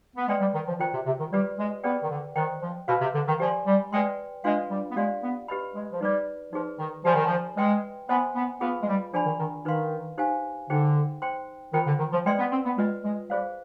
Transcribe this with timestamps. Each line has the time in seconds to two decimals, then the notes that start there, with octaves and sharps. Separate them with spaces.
0.16 B3
0.28 G#3 B4 D5 G5 C6
0.40 G3
0.54 D#3
0.67 F3
0.79 D#3 F4 C5 G5
0.93 C3
1.06 C3
1.19 D#3
1.32 G3 G4 B4 D5
1.58 G#3
1.84 B3 G#4 B4 D5 G5
2.03 D#3
2.10 D3
2.36 D#3 C5 D#5 G5
2.62 F3
2.88 B2 B4 F5 C6
3.01 C3
3.14 D3
3.27 D#3
3.40 F3 G4 D5 G#5 C6
3.67 G3
3.93 G#3 B4 D5 G5 C6
4.44 G#3 D4 F4 B4 F5 C6
4.70 G3
4.91 B3
4.96 G#3 G4 D5 F5
5.22 B3
5.48 G4 B4 D#5 B5
5.75 G#3
5.92 F3
6.01 G3 D#4 B4 D5
6.53 F3 D#4 G#4 B4
6.79 D#3
7.05 F3 G4 D5 G#5 B5
7.15 D#3
7.26 F3
7.57 G#3 B4 D#5 G5 C6
8.09 B3 C5 D#5 G#5 C6
8.35 B3
8.60 B3 F4 G#4 B4 F5 B5
8.82 G#3
8.87 G3
9.13 F3 D4 G#4 D5 G#5 B5
9.26 D#3
9.39 D#3
9.65 D#3 D#4 B4 F5 C6
10.18 D#4 G4 C5 F5 G#5
10.69 D3 D#4 G#4 C5 G5
11.22 C5 G5 C6
11.73 D#3 F4 C5 G5 B5
11.86 D3
11.99 D#3
12.12 F3
12.25 G#3 B4 D5 G5 C6
12.39 B3
12.51 C4
12.65 B3
12.78 G#3 F4 B4 D#5
13.04 G#3
13.29 G3 G#4 C5 F5